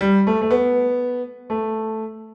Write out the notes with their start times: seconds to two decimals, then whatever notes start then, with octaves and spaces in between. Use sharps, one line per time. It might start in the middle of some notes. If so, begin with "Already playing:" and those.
0.01 G3
0.27 A3
0.42 A3
0.51 B3
1.50 A3